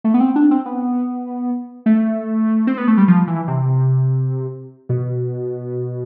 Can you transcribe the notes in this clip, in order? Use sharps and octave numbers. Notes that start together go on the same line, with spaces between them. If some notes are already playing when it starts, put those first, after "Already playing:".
A3
B3
C4
D4
C4
B3
A3
C4
B3
A3
G3
F3
E3
C3
B2